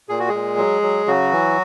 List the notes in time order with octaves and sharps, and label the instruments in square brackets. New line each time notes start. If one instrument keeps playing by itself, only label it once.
[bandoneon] A#2 G#4
F#4
A#2 G#3 G#4
F#3
F#3
C#3 F#3 F#4
E3